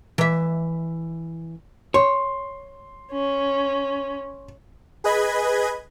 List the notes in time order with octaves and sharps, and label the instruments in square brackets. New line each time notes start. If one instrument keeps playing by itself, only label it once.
[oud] E3 E5
[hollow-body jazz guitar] C#5 [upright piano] C6
[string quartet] C#4
[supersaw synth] G#4 B4 D#5 B5 G#6